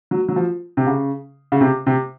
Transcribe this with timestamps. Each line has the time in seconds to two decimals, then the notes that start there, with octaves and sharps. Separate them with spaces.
0.11 F#3
0.29 F#3
0.36 F3
0.77 C3
0.87 C#3
1.52 C#3
1.61 C3
1.87 C3